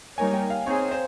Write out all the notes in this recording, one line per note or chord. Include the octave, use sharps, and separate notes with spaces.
G3 A#3 D#4 A#4 C#5 G#5
G5
F5
C4 D#4 G#4 C5 C#5
C5